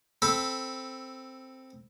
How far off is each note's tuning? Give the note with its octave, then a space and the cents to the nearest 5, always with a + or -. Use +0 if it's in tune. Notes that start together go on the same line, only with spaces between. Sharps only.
C4 +0 A4 +0 B5 +0